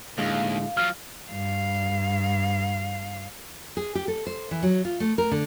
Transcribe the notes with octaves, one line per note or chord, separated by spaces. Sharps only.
D#2 A2 D3 G#3 F5
F#3 F4 F6
G2 F5
G#4
G4
A4
C5
E3
F#3
F4
A3
A#4
D3